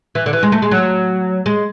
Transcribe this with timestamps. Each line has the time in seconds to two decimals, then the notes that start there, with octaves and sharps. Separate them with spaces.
0.15 E3
0.26 D3
0.33 E3
0.43 G#3
0.52 A3
0.62 G#3
0.71 F#3
1.46 G#3